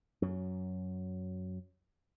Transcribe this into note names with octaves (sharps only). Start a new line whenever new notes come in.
F#2 F#3